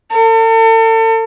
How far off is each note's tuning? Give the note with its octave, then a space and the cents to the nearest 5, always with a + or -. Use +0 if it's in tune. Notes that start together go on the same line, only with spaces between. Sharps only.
A4 +40